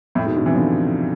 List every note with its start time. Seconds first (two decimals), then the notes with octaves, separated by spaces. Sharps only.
0.15 F2 A2
0.25 G#2 B2
0.36 B2 D3
0.46 C3 E3
0.56 D3 F3